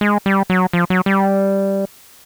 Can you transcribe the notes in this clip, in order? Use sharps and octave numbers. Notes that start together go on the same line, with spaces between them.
G#3
G3
F#3
F3
F#3
G3